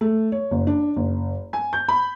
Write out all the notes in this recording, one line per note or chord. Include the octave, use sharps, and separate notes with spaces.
A3
C#5
F#1
D4
F#1
G#5
G6
B5